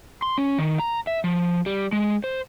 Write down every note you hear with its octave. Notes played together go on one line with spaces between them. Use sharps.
C6
C#4
D#3
A#5
E5
F3
G3
G#3
C5